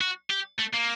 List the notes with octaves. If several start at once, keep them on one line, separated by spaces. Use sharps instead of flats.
F#4
G4
A3
A#3